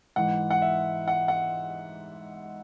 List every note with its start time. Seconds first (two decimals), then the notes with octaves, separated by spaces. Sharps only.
0.16 G#2 E3 F#5
0.50 F#5
0.62 E5
1.08 F#5
1.28 F#5